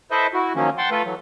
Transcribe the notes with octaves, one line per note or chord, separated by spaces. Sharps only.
E4 A4 B4 C5 D#5 E5
E4 F#4
D#3 F3 F#3 A#3 C#4
F#5 G5 A5 C6
A3 F4 A4 B4
E3 F#3 A3